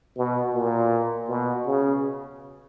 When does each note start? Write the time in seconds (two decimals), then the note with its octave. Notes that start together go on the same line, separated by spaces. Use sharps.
0.17 B2
0.54 A#2
1.28 B2
1.66 C#3